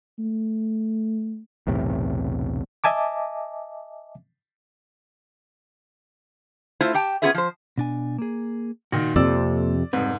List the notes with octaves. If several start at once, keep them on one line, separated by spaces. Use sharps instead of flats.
A3
B1 E2 A2 C3
D#5 E5 G#5 A5 D6
A3 E4 F4 C5
G4 G5 A5
B3 C#4 F4 G#4 B4 E5
F3 C5
B2 D4 G#5
A#3 G#4
A#2 D#3 F#4
F2 C3 F3 A#3 A4 D5 E6
F1 G#2 G3 C4 B4